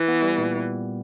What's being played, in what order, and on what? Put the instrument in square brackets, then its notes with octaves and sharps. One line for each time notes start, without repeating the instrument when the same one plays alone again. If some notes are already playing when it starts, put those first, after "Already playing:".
Already playing: [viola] E3
[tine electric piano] B3
G3
A#2